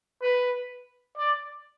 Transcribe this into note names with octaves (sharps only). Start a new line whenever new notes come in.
B4
D5